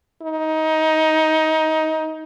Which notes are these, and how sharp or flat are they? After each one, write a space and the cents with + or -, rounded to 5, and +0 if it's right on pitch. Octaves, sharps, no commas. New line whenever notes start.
D#4 +20